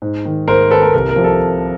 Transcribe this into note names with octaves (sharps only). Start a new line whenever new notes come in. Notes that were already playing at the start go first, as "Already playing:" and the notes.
G#2
D#3
G#2 A#4 C5
D#3 A4 B4
A#4
C2 A#4
A#4
C3 F3
A4